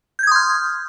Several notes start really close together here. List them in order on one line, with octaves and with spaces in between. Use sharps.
G6 G#6 D#6 C6 F6